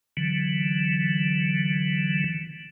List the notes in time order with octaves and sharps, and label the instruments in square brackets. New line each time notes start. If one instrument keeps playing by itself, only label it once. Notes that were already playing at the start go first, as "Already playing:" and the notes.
[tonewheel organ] D3 E3 F#3